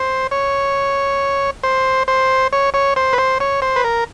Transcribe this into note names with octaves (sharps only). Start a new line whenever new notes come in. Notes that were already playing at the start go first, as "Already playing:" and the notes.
Already playing: C5
C#5
C5
C5
C#5
C#5
C5
B4
C5
C#5
C5
B4
A#4